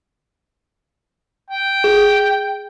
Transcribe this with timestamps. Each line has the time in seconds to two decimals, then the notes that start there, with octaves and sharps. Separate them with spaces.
1.50 G5
1.84 G#4